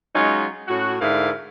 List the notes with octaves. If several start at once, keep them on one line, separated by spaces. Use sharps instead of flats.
F#3 G#3 C#4 D#4 F4
A2 C#4 F#4
G#2 D3 E4 A#4 F5